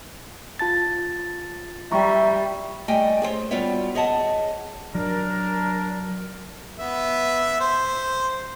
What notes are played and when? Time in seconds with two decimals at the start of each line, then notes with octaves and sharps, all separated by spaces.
0.59 F4 A5 A6
1.92 G3 E5 A#5 C#6
2.88 G3 A3 G4 D#5 G5 G#5
3.22 G#4 A4 C5 C#5
3.51 G3 B3 F4 F#4 C#5 E5
3.95 G#4 C#5 D#5 E5 F#5 A5
4.95 F#3 D4 A#4
6.79 B3 E5
7.60 C5